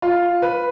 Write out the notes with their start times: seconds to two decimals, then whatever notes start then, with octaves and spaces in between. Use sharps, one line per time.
0.02 F4
0.42 B4